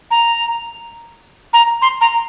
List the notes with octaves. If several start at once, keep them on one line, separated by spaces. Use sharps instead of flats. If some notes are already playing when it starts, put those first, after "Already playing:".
A#5
A#5
C6
A#5